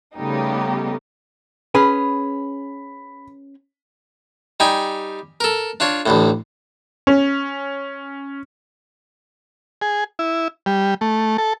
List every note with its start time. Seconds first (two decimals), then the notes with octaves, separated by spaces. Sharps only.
0.16 C#3 G3 A3 B3 D#4 G4
1.75 C#4 G#4 B4 B5
4.60 G3 D#4 G4 G#5
5.40 A4 A#4
5.80 D4 F4 C#5
6.06 A1 D2 A2
7.07 C#4
9.82 G#4
10.19 E4
10.66 G3
11.01 A3
11.38 A4